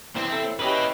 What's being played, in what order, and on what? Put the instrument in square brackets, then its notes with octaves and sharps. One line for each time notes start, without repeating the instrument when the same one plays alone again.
[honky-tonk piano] C2 E3 [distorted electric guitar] C4
[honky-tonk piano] E4 A4
[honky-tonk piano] C#4 E4 G4 [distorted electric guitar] B4 D#5